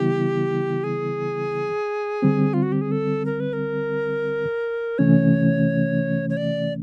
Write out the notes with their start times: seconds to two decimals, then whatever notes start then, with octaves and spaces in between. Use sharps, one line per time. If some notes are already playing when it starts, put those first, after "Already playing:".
Already playing: C#3 E3 G3 B3 E4 G4
0.84 G#4
2.22 D3 G3 C4
2.54 F4
2.63 F#4
2.72 G4
2.81 G#4
2.91 A4
3.25 A#4
3.40 B4
3.53 A#4
4.98 C3 E3 A3 C#4 C#5
6.30 C#5
6.37 D5